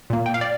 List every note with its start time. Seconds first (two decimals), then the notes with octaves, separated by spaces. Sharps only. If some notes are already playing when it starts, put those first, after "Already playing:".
0.10 A#2 A#3
0.26 G5
0.34 F5
0.41 D5